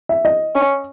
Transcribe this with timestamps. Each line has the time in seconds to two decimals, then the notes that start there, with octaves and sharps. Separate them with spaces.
0.09 E5
0.25 D#5
0.55 C#4